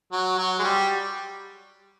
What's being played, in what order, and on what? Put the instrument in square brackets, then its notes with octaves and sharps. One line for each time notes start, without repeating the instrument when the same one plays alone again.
[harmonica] F#3
F#3
G#3
G3